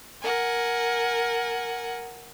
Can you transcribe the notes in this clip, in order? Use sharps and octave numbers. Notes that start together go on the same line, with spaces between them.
A#4 F#5 G#5